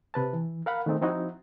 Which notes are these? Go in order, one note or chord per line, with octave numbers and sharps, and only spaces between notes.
C3 B4 A5
E3
A#4 F5 F#5 B5
D#3 G#3 A3 C4 D#4
F3 C4 D#4 E4 F#4